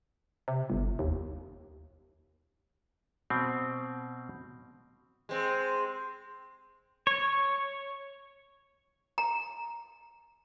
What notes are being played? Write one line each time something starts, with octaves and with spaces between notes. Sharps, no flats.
C3
G1
D#2
B2 C4
G#3 C4
C#5
A#5